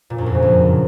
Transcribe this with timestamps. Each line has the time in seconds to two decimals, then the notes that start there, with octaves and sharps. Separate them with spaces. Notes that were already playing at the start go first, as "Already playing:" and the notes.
0.10 A#2
0.18 F#2
0.26 F2
0.34 C#3
0.42 F#2